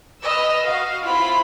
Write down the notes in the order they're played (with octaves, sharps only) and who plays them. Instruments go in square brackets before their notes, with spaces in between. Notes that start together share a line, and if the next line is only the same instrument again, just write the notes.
[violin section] B4 E6 F6 [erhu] D#5
[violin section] F#4 [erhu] F5
[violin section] C4 E4 F4 [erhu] B5